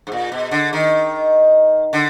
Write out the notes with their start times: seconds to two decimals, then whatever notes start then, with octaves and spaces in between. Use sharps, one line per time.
0.07 G#2
0.12 A#2
0.32 B2
0.51 D3
0.73 D#3
1.93 D3